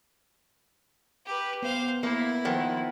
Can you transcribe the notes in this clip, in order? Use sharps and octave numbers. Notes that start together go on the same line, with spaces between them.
G4 B4
B3 C5 F5
A#3 B3 E4
D#3 F3 F#5